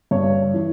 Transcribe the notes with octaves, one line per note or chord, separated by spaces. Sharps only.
G2 C#5
E3